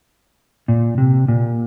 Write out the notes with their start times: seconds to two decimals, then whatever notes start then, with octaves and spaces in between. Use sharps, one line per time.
0.68 A#2
0.98 C3
1.28 A#2